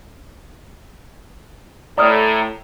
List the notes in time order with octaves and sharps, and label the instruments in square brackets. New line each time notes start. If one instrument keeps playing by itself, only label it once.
[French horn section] A2 [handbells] D5 D#6 F6 [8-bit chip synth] A#5